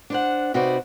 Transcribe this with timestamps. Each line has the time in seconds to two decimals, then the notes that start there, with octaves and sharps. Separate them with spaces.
0.10 D4 C5 F#5
0.54 C3 D#4 F#4 B4 C5 D5